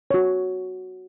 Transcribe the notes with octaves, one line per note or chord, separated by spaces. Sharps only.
F#4 C#5